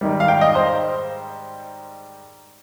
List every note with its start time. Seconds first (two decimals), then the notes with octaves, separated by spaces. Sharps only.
0.01 G#2 D#3 G3
0.20 F5
0.28 G5
0.41 D#5
0.55 C5